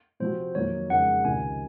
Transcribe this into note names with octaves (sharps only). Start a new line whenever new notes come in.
C3 F3 C4 F#4 C5
F2 D#3 F#3 A#3 C#5
F2 C#3 G#3 D#4 A#4 F#5
C#2 C3 D#3 G#5